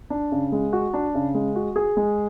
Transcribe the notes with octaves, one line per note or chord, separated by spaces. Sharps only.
D4
C#3
G#3
F#4
D4
C#3
G#3
F#4
G#4
G#3